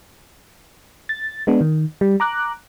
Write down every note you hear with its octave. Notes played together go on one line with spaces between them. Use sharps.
A6
G#3 B3 D4
D#3
G3
A#5 D6 F#6